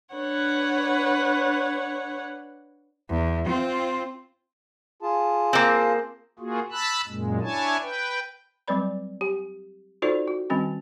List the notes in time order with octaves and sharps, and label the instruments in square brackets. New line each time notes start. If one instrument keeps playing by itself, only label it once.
[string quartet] D4 B4 C#5 F#5
[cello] E2
C4 F4
[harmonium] F4 G#4 A5
[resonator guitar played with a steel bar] A#3 C4
[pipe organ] A#3 F4 F#4 G#4
A5 B5 E6 F#6
F#2 A#2 G#3
D4 E4 C#5 G#5 A5
B4 G5
[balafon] F#3 G3 C4 B4 D5 B5
G4
D#4 F4 F#4 A4 C5 D5
F#4
D#3 G3 C4 C#4 F#4